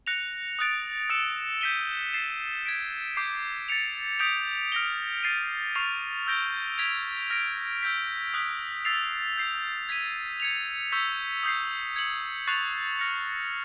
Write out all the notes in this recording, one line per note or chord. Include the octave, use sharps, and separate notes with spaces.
F#6 A#6 C#7 F7
D#6 F#6 A6 D7
E6 A6 C#7 E7
G6 B6 D#7 G7
A6 C7 E7
G#6 B6 D7
D6 G6 C7
A6 C#7 F7
D#6 G6 B6 D7 F7
F6 A#6 D7 G7
A6 C7 D#7
C#6 F6 A6 C7 F7
E6 G6 A#6 D7 G7
G#6 B6 D7 F7
F6 A#6 D7
E6 G6 B6
D#6 F#6 B6
E6 A6 C7 F7
G6 C7 F7
G#6 B6 D#7
G#6 C#7 F7
C#6 E6 G6 B6
D#6 G6 C7
G#6 C#7 F#7
C#6 F#6 A6 C7 F7
F6 A#6 C#7